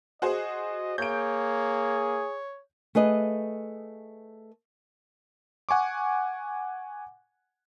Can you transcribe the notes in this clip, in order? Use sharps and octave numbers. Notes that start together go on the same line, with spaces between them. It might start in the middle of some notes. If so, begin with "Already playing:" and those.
F#4 G#4 C5 D#5
A#3 G#4 C#5 G6 D7
A3 G#4 B4 D#5
F#5 G#5 C#6 D6